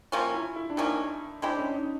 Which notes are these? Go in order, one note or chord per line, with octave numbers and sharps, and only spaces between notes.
C3 F3 A#3 C#4 F4
E4
E4
D4
C3 F3 A#3 C#4 D#4
G#3 C4 D4 E4 G4
C#4
D#4